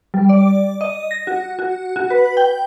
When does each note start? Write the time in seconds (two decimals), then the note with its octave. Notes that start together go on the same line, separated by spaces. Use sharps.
0.14 G3
0.29 D5
0.81 D#5
1.11 A#6
1.27 F#4
1.59 F#4
1.96 F#4
2.10 B4
2.37 G5